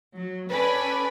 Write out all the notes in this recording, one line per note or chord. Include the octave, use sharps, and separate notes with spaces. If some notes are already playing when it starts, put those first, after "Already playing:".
F#3
C#4 A4 B4 D5 G#5 B5